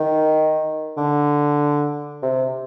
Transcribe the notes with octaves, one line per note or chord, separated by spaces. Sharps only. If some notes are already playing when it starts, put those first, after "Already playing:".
Already playing: D#3
D3
C3